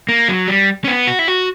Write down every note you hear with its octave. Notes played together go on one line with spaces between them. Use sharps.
A#3
F#3
G3
C#4
B3
F#4
E4
F#4